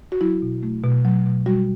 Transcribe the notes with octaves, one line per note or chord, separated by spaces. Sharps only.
F#4
F#3 E4
B2
A3
B2
F#3
B2
G3 F#4